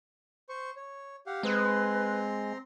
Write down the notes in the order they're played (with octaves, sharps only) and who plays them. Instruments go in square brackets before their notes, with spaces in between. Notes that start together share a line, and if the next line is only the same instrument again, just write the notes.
[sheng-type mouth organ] C5 C#6
C#5
G4 F5 F#5
[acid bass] G#3 [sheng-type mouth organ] C4 A#5 C6 [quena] B4